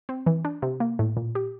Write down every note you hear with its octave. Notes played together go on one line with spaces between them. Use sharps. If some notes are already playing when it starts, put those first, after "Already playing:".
C4
E3
D4
C3
A#3
A2
A#2
G4